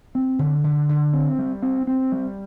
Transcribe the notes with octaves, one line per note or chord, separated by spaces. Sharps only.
C4
D3
D3
D3
C4
G3
C4
C4
G3